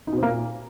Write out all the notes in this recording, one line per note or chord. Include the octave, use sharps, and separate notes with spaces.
D#4
B2
C4
A#3
A#2